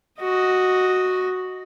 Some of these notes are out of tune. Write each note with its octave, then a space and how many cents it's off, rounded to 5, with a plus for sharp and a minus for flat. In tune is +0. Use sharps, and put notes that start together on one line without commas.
F#4 +0 D#5 +0